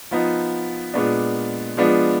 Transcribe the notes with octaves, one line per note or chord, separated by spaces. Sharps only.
F3 B3 D#4
A#2 G#3 B3 D4
F3 G#3 B3 D4